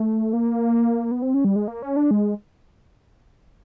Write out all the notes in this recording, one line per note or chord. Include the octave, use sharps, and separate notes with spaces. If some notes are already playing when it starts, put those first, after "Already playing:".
Already playing: A3
A#3
B3
C4
C#4
G3
G#3
A#3
C#4
D4
G#3